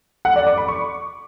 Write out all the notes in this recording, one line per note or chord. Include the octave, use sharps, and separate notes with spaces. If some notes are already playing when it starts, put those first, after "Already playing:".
F#5
D5
D6
B5
C#6